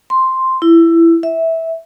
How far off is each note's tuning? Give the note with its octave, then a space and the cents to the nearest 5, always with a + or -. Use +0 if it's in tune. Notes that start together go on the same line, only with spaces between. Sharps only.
C6 +0
E4 +15
E5 -15